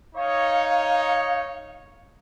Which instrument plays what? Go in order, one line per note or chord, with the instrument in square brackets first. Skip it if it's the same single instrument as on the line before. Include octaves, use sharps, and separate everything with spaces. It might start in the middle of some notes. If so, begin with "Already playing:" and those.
[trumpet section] D#4 C#5 [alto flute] F5